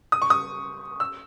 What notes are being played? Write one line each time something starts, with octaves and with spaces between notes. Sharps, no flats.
D#6
C#6
D#6
E6